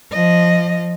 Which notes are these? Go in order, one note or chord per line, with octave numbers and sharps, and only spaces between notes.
F3 D#5